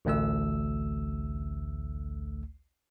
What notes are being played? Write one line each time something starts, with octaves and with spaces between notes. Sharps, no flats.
A1 D2 A3 E6